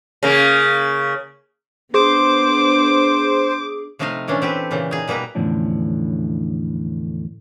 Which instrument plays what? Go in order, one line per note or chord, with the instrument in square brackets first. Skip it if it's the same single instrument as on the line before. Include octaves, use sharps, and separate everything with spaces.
[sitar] C#3 A#3
[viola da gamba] B3 D4 [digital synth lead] G#4 [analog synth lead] C5 [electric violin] D6
[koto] C3 F3 A3 D#4 D#5 F5
A#2 E3 C#4 D4
C4 G4 A4 B4
A#2 C#3 E3
D#4 G#4
B2 G3 A#3 B4 A#5
[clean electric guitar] E2 A2 D3 F3 C#4 D4